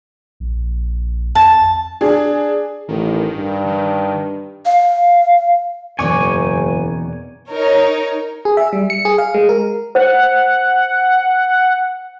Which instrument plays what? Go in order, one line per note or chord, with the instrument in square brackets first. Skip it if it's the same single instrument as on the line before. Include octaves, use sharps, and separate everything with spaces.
[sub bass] A#1
[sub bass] F2 [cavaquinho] A5
[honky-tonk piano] D4 G#4
[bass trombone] A1 [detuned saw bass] D#3
[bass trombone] G2
[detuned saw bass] D#3
[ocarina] F5
[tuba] F#1 [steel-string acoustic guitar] E2 B2 D#3 [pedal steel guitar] G#5 C#6 D6
[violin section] D#4 A#4 C#5
[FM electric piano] G#4
E5
G3
C#7
G#4
F5
G#3
A#4
[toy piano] C5 [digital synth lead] F#5